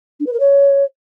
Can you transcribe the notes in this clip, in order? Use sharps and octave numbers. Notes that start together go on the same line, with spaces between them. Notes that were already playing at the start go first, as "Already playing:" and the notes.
D4
B4
A#4
C#5